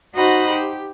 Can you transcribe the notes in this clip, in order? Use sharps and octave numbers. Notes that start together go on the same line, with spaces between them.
D#4 F#4 C5 D#5 F#5 B5
G4